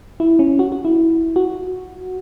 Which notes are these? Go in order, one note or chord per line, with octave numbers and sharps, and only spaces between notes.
E4
C#4
F#4
F#4
E4
F#4